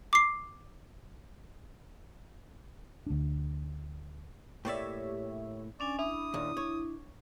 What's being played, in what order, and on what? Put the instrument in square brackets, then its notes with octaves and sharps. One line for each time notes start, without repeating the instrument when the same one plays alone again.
[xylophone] D6 C7
[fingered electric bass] D2 D4
[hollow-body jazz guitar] A2 A#3 D5 [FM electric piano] G4 C#5 E5
[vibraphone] C#4 D4 G#5 [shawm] D5
[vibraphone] D4 [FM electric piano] E4 [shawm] D#6
[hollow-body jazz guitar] D#2 A#2
C#5